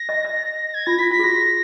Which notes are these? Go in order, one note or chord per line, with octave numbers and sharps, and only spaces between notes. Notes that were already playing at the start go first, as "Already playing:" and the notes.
Already playing: A#6
D#5
D#5
A#6
G#6
F4 A#6
F4 B6
F4 B6
G#4
F#4 A#6